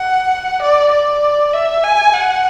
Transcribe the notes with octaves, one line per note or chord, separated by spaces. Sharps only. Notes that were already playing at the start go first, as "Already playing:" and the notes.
Already playing: F#5
D5
D5
E5
G#5
F#5